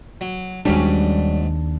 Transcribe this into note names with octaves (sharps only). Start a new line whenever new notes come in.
F#3
D#2 G#2 F#3 G3 C#4 D4